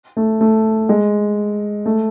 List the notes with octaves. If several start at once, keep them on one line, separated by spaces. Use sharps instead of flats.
A3
A3
G#3
A3